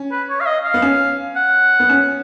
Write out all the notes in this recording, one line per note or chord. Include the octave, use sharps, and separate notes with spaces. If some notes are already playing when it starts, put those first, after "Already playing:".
Already playing: C#4
B4
C#5
F5
D#5
F5
B3
C#4
F#5
B3
C#4